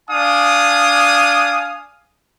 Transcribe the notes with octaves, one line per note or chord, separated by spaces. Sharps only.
D4 F5 G#5 D#6